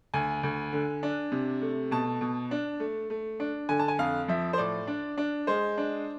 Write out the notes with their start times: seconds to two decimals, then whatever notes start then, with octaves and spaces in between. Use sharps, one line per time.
0.14 D2 G#5
0.43 D2
0.73 D3
1.03 D4
1.32 C3
1.62 A3
1.91 B2 A5
2.21 B2
2.51 D4
2.80 A3
3.10 A3
3.40 D4
3.69 D3 G#5
3.79 A5
3.88 G#5
3.99 F2 F5
4.28 F3 E5
4.53 C5
4.58 A2 D5
4.87 D4
5.18 D4
5.47 G#3 C5
5.78 D4